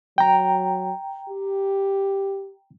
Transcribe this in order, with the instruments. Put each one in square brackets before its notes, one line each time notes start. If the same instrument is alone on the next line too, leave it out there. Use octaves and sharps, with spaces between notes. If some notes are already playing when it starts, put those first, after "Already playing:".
[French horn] F#3 [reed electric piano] G5 A#5
[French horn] G4